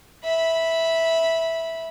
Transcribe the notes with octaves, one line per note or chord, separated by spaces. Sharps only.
E5 B5